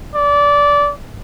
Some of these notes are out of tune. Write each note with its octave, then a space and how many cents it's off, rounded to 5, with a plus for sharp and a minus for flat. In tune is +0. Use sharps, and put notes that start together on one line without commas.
D5 -20